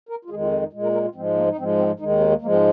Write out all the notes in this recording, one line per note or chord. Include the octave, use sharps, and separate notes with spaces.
A#4
F4
F2 D#3 G#3 G#4
F4
C4
D#4
A#2 G#3
A#4
A#4
F4
G#2 F3 G#3 C4
A#3
D#4
G#2 F3 G#3 C4
C4
D#2 D#3 G#3 D#4
D#4
C4
A#3
G#2 F3 G#3 A#3
C4